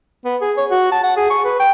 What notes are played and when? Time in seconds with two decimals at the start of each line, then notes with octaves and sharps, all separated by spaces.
0.25 B3
0.41 G#4
0.57 C#5
0.70 F#4
0.92 A5
1.04 F#5
1.17 G#4
1.30 C#6
1.45 B4
1.60 G5